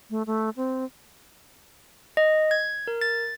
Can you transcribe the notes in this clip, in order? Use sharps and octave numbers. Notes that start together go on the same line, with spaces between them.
A3
A3
C4
D#5
G#6
A#4
A6